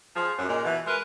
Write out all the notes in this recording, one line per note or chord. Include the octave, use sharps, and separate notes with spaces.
F3 G#4
F#2
A#2 G#3
B2 E3
G#3 G#4 A#4 B4